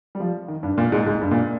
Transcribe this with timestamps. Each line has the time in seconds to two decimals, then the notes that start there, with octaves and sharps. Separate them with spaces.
0.15 G3
0.20 F3
0.48 D#3
0.63 G2
0.78 A#2
0.92 G#2
1.06 G#2
1.21 G2
1.31 A#2